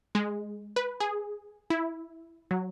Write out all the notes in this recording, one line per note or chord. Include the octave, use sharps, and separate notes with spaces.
G#3
B4
G#4
E4
F#3